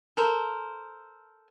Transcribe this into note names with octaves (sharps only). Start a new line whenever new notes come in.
A4 A#4 C5